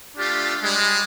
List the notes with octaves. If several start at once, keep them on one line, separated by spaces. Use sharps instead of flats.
A3 D4 F4 G4
G3 G#3